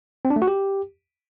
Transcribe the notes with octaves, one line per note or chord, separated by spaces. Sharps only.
C4
D4
A3
F#4
G4